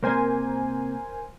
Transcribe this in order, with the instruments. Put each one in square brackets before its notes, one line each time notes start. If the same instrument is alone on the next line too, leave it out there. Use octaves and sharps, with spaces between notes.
[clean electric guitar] C3 A#3 [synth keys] A#4 C5 G#5